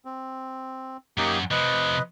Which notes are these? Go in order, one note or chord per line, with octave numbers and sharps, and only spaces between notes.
C4
F#2 F#3 A#3 D#4 G4
C3 F3 B4 D#5